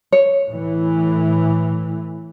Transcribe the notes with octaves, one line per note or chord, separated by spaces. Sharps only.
C#5
A2 E3